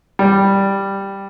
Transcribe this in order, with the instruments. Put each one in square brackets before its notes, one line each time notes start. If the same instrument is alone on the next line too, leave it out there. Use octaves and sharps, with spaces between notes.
[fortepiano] G3